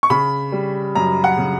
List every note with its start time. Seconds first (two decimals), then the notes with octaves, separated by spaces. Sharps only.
0.03 C#6
0.10 C#3 B5
0.52 G3
0.95 F#2 A#5
1.24 F#5
1.38 C#3